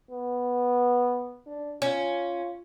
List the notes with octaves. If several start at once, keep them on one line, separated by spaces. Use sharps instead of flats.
B3
D4
C#4 F4